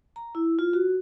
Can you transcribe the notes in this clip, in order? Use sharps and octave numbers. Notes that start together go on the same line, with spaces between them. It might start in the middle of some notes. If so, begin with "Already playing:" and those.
A#5
E4
F4
F#4